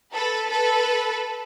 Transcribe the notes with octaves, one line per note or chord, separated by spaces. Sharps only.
A4 B4
A4 B4